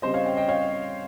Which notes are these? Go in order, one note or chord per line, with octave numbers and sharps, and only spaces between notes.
C#3 G3 C4 C5 D#5
C#5 F5
D#5 G5
D#5 G5
C#5 F5